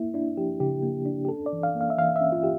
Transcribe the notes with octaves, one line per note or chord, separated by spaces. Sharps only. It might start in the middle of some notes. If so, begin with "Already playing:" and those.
Already playing: A#3 E4
D4 E4
F3 G4
C#3 G4
A#3
D4
G4
C#4 A4
D5
E3
F5
A#3
F5
E5
E3 F5
E5
C#4
F4
G4